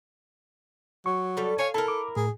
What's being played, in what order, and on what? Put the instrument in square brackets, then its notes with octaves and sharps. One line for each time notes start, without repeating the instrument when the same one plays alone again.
[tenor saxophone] F#3 [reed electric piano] C#6
[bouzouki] G3 A4
[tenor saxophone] C#5 [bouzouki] F5 G#5
[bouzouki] E4 A#4 [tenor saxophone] A4 [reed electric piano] A5
[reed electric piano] D6
[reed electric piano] A2 [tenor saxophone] G#4